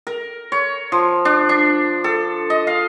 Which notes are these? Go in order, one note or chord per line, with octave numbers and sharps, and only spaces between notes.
A#4
C#5
F3
D4
D4
A4
D#5
F5